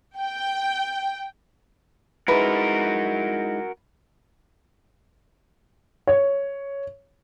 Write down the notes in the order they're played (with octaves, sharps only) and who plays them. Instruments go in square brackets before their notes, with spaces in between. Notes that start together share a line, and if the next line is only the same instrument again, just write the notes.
[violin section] G5
[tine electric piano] G#3 D#4 E4 [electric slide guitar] F#4 A#4 [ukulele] B4
[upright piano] C#5